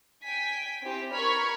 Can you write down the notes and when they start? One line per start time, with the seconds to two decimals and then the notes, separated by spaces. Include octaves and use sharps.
0.23 G5 G#5 B6
0.83 C4 E4 G4
1.13 A#4 B5 C#6 F6 G#6